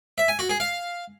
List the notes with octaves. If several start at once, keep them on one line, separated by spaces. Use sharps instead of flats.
E5
G#5
F#4
G#4
F5